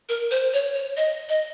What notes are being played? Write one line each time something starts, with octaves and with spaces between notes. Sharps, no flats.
A#4
C5
C#5
C#5
D#5
D#5